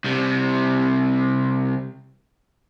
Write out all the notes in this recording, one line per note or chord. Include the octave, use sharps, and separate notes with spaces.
C2 C3